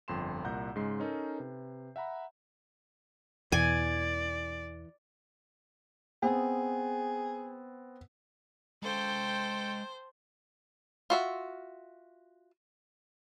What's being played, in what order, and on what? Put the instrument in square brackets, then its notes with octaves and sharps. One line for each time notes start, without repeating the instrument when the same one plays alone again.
[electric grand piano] G1 F2 G5 C6 E7
C2 A#2 F#5 A#5 G6
G#2 C#3 G#3 C6 C7
C#4 D#4 A4 A#4
C3 B4
E5 F#5 A#5 B5
[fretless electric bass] E2 B2 [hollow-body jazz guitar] E3 [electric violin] D5 [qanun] G#5
[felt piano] B3 C4 [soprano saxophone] G#4
[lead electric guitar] G#3 F5 [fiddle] A4 G5 [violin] C5
[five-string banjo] F4 F#4 E5